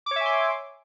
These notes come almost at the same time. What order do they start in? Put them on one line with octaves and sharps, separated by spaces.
D6 C#5 E5 G#5 C6